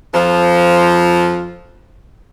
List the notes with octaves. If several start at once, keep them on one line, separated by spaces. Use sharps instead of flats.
F2 F3